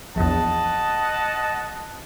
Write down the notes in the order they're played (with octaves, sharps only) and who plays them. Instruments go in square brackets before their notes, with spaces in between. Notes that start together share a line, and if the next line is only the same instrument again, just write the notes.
[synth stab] A#1 E2 [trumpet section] D#5 F#5 A5